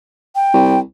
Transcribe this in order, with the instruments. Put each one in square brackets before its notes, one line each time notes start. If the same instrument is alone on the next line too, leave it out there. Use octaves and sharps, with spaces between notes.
[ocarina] G5
[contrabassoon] C2